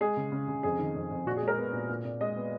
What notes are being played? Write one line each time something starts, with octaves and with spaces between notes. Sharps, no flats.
G#3 G#4
C#3
C#3
C#3
F2 G#4
D#3
F2
F2
A#2 F#4
G#4
G#3
A#4
B3
A#2
A#2
A#2
G#3 D#5
B3